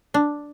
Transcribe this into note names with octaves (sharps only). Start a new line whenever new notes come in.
D4